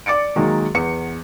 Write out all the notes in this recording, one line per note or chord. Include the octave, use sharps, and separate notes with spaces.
D5 D6 A6 C#7 D7
D#3 F#3 G#3 A#3
E2 B3 C#7